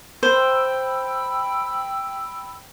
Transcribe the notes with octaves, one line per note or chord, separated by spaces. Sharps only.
C5 G5 B5 E6